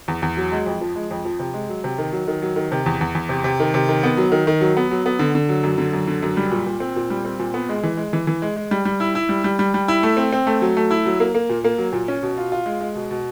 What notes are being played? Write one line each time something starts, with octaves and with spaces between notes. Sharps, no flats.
E2
E2
F#3
G#3
F2
F3
G#3
F2
F3
C3
G#3
F#3
C3
D#3
F#3
D#3
F#3
D#3
C3
E2
E2
E2
C3
C3
D#3
C3
D#3
B3
F#3
D#3
D#3
F#3
B3
F#3
B3
D3
D3
F#3
F#2
D3
F#2
D3
F#2
G3
A#2
A#2
C4
A#2
G3
C4
A#2
B3
G#3
E3
G#3
E3
E3
G#3
G#3
G3
G3
E4
E4
G3
G3
G3
G3
E4
A3
C4
C4
A3
F#3
A3
E4
F#3
A#3
A#3
A#2
A#3
F#3
A#2
C#4
B2
F4
F4
G#3
G#3
B2
B2